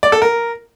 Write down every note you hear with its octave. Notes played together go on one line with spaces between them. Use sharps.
D5
A4
A#4